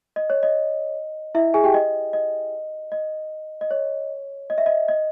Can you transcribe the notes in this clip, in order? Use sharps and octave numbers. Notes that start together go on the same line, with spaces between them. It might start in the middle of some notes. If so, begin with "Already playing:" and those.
D#5
C#5
D#5
E4 E5
G#4 G#5
G4 G5
D#5
D#5
D#5
D#5
C#5
D#5
E5
D#5
D#5